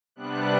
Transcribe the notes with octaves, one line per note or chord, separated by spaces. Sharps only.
C3 G3 B3 D4 F#6